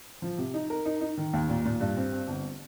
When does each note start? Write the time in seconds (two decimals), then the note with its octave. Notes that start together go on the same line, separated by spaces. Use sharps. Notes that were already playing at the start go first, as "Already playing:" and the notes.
0.22 F3
0.38 C3
0.54 D#4
0.70 A#4
0.85 D#4
1.01 D#4
1.17 D#3
1.33 D#2
1.49 A#2
1.65 A#2
1.80 G2
1.97 C4
2.12 C4
2.28 G1